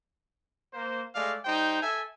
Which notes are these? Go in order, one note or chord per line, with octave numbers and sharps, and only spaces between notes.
A#3 C5
G#3 A3 D5 F5
G3 D#4 C5 G5
A4 E5 G#5